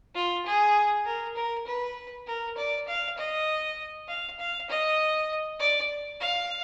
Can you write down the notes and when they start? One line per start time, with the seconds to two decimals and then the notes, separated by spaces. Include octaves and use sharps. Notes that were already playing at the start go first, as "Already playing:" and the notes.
0.15 F4
0.45 G#4
1.05 A#4
1.36 A#4
1.66 B4
2.27 A#4
2.57 D5
2.87 F5
3.18 D#5
4.08 F5
4.39 F5
4.69 D#5
5.59 D5
6.20 F5